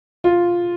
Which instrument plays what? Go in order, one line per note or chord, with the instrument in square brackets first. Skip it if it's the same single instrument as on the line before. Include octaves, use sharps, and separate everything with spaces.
[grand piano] F4